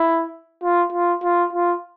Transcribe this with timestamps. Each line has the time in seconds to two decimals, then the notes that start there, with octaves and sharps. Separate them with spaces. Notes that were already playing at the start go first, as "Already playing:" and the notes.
Already playing: E4
0.63 F4
0.93 F4
1.23 F4
1.53 F4